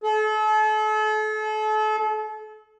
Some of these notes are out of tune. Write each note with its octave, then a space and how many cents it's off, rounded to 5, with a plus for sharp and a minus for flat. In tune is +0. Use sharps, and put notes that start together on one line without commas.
A4 -40